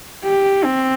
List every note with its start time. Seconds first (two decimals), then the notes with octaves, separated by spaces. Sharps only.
0.24 G4
0.64 C4